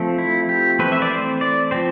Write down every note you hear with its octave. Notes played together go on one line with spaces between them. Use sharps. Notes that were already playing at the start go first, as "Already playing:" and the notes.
Already playing: F3 A3 C4
E4
G4
E3 A3 C4 B4
E5
D5
C5
D5
F3 C4 C5